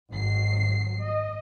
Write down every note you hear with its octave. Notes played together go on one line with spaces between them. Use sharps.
G#1 F#3 C7
D#5